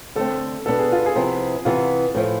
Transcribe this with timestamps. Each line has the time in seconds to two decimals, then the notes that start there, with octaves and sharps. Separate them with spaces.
0.16 D3 A3 C4 A4
0.66 B2 B3 D4 A4
0.79 G#4
0.92 F4
1.06 G#4
1.15 C3 F3 B3 E4
1.65 C3 E3 B3 F4
2.15 A2 F3 A3 E4